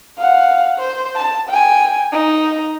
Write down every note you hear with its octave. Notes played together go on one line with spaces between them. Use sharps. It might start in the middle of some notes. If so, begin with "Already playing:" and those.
F5 F#5
C5
A5
G5 G#5
D#4